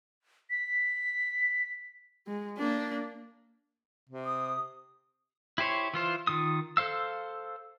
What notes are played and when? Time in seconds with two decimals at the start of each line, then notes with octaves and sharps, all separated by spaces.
0.50 B6
2.27 G#3
2.58 A#3 D4
4.09 C3
4.24 D#6
5.58 E4 G4 C5 C#5
5.94 E3 F4 C5
6.27 D#3 F4 D#6
6.77 A4 C5 F5 E6